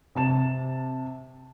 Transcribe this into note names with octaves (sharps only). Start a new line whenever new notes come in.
C3 A5 E7